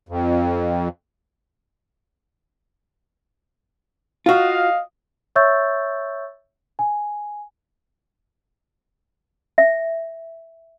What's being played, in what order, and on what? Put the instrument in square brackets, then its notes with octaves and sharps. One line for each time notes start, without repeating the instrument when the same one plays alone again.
[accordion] F2
[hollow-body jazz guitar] F4 F#4 [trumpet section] D#5 F5
[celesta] C#5 E5 C#6 E6 G6 A6
G#5
[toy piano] E5